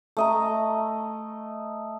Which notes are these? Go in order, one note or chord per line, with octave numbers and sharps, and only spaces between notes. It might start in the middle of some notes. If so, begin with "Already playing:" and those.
A3 D#5 A#5